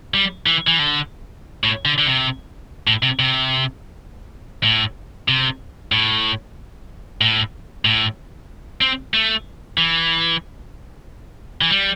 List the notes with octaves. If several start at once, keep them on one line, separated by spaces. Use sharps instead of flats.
G3
E3
E3
D3
A2
D3
D3
C3
A2
C3
C3
A2
C3
A2
A2
A2
C4
A3
E3
E3
G3